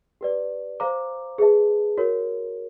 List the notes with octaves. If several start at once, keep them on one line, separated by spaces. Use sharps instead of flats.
G4 B4 D5
C5 F5 A#5 D6
G#4 B4 E5 A5
F#4 A#4 C#5